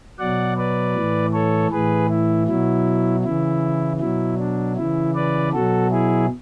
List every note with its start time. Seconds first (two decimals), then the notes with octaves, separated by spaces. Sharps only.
0.19 B2 F#3 D5 F#5
0.57 B4 D5
0.95 A2 E3
1.33 A4 C#5
1.71 A2 E3 G#4 B4
2.10 E4
2.48 B2 F#3 E4
3.24 C#3 E3 E4
4.00 B2 F#3 E4
4.38 D4
4.77 C#3 E3 E4
5.15 B4 D5
5.53 B2 F#3 F#4 A4
5.91 E4 G#4